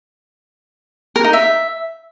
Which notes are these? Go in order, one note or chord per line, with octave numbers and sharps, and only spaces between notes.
A#4
D#4
E5